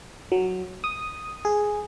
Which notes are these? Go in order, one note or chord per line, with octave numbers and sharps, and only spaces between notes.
F#3
D#6
G#4